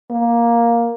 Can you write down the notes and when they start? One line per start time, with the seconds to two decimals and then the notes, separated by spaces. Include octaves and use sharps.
0.11 A#3